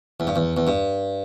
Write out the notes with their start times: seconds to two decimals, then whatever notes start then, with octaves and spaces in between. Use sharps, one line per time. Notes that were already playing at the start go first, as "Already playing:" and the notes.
0.20 E2
0.27 G2
0.36 E2
0.57 E2
0.67 G2